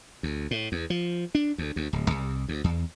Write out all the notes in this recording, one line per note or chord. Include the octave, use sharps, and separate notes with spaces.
D2
A2
E2
F3
D4
D2
D2
D1
C2
D2
E2